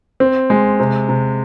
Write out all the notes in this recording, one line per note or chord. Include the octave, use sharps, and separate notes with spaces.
C4
G#3
C3
C3